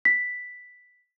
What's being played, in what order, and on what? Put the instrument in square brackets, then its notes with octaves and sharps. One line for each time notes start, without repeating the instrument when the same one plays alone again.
[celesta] B6